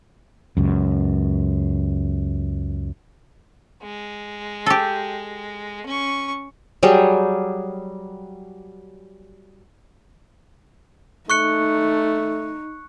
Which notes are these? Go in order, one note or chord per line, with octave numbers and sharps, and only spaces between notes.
C#2 F#2
G#3
G4 A4
C#4 C#6
F#3 G3 G#4 G5
A3 D#4 C#6 F#6 C#7